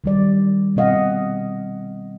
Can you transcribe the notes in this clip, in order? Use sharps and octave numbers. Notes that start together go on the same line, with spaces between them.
D#3 G3 D5
B2 C4 D#5 F5 F#5